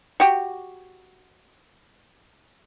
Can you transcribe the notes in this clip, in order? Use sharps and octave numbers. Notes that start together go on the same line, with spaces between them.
F#4 G4